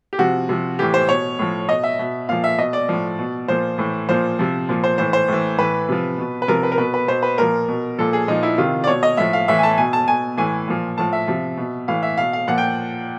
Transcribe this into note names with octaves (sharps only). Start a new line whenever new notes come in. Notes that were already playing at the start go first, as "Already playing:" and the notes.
G4
C3 F3 F#4
C3 F3
A2 E3 G4
C5
B2 C#5
A2 F3
B2 D#5
E5
B2
A#2 F3 F5
E5
B2 D#5
D5
A2 F3
B2
A#2 F3 C5
A2 E3
A#2 F3 C5
C3 F3
A#2 F3
C5
A2 E3 C5
C5
A2 E3
A2 E3 B4
C3 F3
B2
B4
C3 F3 A#4
B4
A#4
B2 B4
B4
B2 C5
B4
A#2 F3 A#4
B2
A#2 F3 A4
G#4
A#2 F3 D#4
E4
C3 D#3 F4
D5
B2 C#5
D#5
A2 F3 E5
F5
A2 E3 E5
G#5
A5
B2 G#5
A5
B2 G#5
A2 E3 G#5
A#2 F3
A2 F3 A5
E5
C3 F3
B2
A2 E3 F5
E5
B2 F5
F5
A#2 F3 F#5
G5